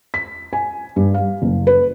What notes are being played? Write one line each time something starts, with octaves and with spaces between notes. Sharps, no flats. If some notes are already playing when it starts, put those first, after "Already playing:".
B6
G#5
G2
F5
F#1
B4